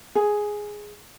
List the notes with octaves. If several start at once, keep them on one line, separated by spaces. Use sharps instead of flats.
G#4